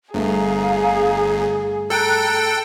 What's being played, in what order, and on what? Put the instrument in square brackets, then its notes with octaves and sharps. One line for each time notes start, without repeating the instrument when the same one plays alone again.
[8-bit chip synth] G1 [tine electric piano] G2 A3 [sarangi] G#4 [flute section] F5 A#5
[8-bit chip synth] A4 G5 [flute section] A#5 F#6